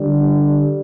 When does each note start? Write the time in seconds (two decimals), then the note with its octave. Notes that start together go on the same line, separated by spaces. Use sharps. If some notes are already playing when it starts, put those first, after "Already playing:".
Already playing: D3 G3